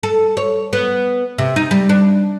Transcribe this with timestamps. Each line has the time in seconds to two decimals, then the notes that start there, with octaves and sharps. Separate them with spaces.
0.03 A4
0.37 C#5
0.73 B3
1.38 C3
1.56 D#4
1.71 G3
1.89 D4